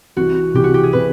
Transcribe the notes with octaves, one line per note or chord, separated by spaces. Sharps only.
C2 C3 E3 F#4
C2 C3 E3 G4
F#4
G4
G#4
C3 E3 B4